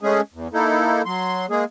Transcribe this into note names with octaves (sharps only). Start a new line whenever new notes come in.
G#3 A3 C#4 G#4
E2
A#3 D#4 E4 A4
F#3 C6
G#3 A#3 G#4